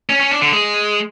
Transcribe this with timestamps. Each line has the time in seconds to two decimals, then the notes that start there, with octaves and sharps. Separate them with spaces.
0.10 C#4
0.20 C#4
0.31 D4
0.42 D3
0.53 G#3